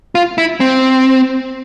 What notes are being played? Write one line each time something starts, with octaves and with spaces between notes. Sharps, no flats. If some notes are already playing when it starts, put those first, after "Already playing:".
F4
E4
C4